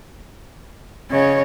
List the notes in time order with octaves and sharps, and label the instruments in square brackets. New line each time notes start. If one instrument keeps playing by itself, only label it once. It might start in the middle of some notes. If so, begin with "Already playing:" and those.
[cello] C#3 [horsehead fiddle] C#5 D#5